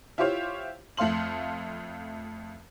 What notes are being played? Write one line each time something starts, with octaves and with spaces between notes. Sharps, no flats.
E4 F4 G4 C5 C#5 F5
F2 A3 F5 C6 F#7